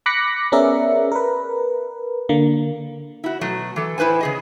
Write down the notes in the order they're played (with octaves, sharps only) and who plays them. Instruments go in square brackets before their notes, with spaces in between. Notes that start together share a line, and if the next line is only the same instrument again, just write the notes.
[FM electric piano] B5 D6 F#6 A#6 B6 C#7
B3 C#4 G#4 A#4 D5 E5
A#4 B4
D3 A#3
[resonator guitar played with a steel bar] E4 F#4
B2 F#3 A3
E3 A4
A2 E4 B4 C5 G#5
C#3 G#4 D#5